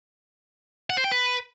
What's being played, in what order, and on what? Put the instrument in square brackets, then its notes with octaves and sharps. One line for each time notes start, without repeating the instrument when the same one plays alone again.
[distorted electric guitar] F#5
C5
G5
B4